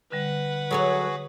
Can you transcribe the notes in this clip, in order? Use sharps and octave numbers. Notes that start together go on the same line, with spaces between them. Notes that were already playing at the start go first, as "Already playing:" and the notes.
D3 G3 B4 F#5
F#3 F#4 G#4 A4 C#5